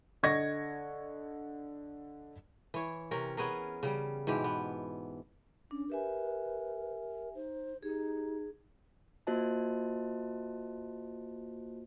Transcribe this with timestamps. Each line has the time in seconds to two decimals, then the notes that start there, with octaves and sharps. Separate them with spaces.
0.23 D3 D#5 C#6 G#6 A#6
2.74 E3 C#5
3.11 C3 C#4 A#4
3.37 B3 C#4 G#4 A#4
3.83 C#3 G3
4.27 G#2 B2 E3 G4
4.44 B3
5.71 C#4 D4
5.90 G4 A#4 B4 E5 G#5
7.35 D#4 C5
7.83 D#4 G4 G#4
9.27 A#3 F4 F#4 C5 D#5 A5